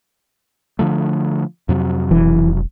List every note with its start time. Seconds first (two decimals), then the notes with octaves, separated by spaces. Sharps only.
0.79 D3 F3 A3
1.69 F2 C3 F#3
2.11 E1 E3